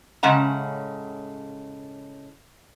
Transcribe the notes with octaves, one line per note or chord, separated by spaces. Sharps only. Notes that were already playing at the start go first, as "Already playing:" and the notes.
A2 C#3 G#3 C#4 F#5 A#5